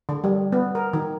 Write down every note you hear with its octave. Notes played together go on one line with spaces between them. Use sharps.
D3
G3
B3
A#4
D#3